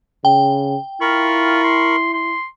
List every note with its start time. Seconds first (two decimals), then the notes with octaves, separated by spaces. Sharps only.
0.25 C#3 G5
1.01 E4 F4 A#4 B5 C#6
1.64 C6
2.13 C6